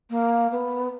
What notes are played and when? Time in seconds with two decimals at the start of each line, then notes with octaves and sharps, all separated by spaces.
0.10 A#3
0.51 B3